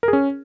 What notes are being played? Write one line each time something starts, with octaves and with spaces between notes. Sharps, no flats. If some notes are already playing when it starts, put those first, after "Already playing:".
A#4
G#4
C#4